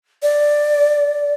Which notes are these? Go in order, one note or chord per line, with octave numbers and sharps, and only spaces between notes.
D5